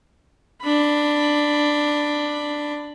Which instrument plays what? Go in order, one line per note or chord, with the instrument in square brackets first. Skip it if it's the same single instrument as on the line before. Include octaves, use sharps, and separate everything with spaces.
[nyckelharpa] D4 B5